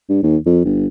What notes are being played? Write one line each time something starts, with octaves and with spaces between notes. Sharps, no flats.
G2
D#2
F2
G1